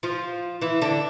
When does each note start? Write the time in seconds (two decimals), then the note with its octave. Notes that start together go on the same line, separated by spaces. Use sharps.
0.03 F3 F4
0.61 E3 E4
0.81 D3 D4